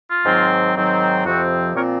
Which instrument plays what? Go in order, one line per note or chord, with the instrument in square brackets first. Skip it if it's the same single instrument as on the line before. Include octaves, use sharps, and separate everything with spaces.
[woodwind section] F4
G#2 D#3 F#3 C4
G#2 D#3 F#3 C4
F2 C3 F3 C4 F#4
A#2 F3 C4 A#4 C#5